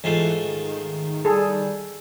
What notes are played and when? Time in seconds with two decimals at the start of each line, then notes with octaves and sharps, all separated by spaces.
0.04 G#2 E3 A3 F4
0.45 D#3
1.25 G3 G#4 A4